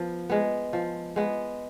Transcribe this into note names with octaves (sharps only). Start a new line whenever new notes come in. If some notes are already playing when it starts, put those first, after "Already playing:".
Already playing: F3 B3
G#3 B3
F3
G#3 B3